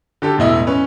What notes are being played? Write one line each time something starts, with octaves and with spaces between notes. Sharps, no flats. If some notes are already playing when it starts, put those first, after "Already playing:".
D3 G4 A4
E1 A2 E4 D#5
C#4 B4